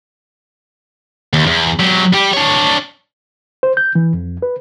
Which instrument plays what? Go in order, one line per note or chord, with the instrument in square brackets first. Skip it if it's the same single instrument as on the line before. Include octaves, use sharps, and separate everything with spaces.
[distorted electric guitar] D#2
E2
F#3 G4
G3 G4
D4 C#5
[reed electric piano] C5
G6
E3
F2
B4